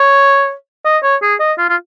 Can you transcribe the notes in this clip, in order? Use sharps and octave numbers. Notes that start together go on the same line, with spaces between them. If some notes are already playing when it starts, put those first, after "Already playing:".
Already playing: C#5
D#5
C#5
G#4
D#5
F4
F4